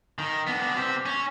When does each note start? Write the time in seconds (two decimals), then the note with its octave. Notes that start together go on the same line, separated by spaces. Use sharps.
0.18 D#3
0.47 B3 D4
0.75 C4 G4
1.06 C#4